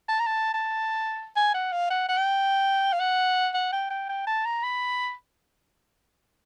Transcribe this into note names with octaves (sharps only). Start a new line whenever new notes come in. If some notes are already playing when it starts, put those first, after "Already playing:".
A5
A#5
A5
A5
G#5
F#5
F5
F#5
F#5
G5
F5
F#5
F#5
G5
G5
G5
A5
A#5
B5